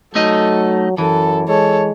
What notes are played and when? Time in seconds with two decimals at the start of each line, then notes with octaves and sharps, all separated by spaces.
0.15 F#3 A3 D#4 A4 D#5
0.98 F#2 E3 A4
1.48 G#3 A4 C#5